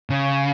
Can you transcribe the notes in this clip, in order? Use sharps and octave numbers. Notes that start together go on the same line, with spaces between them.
C#3